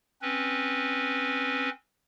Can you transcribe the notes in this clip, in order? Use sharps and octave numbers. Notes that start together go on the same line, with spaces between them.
C4 C#4 B4